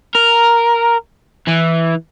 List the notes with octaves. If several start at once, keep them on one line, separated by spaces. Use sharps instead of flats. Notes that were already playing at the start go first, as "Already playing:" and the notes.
A#4
E3